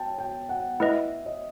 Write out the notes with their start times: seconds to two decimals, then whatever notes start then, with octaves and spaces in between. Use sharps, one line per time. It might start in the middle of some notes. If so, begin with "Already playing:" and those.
Already playing: G5 A5
0.18 G5
0.49 F#5
0.80 A3 E4 B4 D#5 E5
1.26 D#5